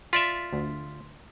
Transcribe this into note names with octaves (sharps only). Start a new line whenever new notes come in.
F4 D5 E5 C6 B6
D2